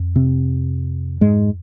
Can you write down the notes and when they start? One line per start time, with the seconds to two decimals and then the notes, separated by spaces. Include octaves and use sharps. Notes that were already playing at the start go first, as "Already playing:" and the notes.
Already playing: F2
0.16 C3 C4
1.21 G#2 G#3